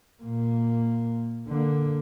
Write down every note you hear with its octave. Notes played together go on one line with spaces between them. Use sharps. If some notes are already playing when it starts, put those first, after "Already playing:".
A#2 A#3
D3 A#3